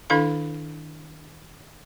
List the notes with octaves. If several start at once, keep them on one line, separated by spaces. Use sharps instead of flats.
D#3 D4 E4 A4 F5 B5